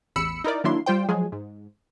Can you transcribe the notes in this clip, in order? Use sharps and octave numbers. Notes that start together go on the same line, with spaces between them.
A1 E2 B5 E6 C#7
D#4 E4 A#4 D5
D#3 F#3 A#3 D4 E4 C6
G3 F4 C5 G5
F3 F#3 G#3 G#4
G#2